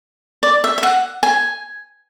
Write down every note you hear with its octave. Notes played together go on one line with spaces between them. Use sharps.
D5
E5
E5
F#5
G#5